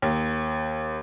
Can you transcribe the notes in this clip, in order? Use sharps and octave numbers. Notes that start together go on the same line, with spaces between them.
D#2